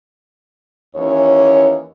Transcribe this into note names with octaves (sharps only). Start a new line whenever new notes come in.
D#2 E3 C#4 C#5